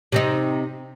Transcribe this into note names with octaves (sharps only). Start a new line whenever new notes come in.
C3 C4 D#4